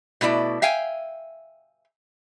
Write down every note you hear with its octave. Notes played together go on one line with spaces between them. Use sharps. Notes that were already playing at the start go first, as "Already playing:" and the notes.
B2 A3 E4 D5
E5 F5 G5 G#5